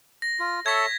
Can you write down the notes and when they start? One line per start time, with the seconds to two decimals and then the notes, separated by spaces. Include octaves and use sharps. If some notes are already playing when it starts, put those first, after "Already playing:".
0.22 A#6
0.40 F4
0.66 A4 C#5 E5 G#6 B6